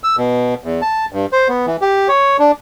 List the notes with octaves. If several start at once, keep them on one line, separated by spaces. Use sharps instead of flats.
E6
B2
E2
A5
G2
C5
B3
E3
G4
C#5
D4